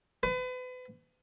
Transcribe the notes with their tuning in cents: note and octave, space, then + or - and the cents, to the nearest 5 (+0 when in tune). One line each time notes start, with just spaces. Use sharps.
B4 +35